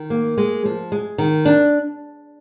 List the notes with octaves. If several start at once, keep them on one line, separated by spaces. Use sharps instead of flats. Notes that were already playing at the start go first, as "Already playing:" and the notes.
Already playing: D#3
A#3
G#3
F3
G#3
D#3
D4